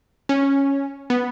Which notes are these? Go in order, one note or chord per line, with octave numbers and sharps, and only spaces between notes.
C#4
B3